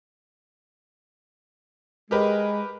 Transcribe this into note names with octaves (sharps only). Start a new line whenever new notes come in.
G#3 G4 A#4 B4